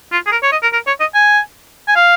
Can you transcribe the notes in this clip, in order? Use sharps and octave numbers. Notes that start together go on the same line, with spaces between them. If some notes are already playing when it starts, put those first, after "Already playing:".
F4
G#4
A#4
C#5
D#5
A#4
A#4
C#5
D#5
G#5
G#5
F5